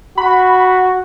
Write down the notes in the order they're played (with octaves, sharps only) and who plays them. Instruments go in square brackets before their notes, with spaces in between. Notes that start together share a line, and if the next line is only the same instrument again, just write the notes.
[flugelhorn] F#4 [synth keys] B5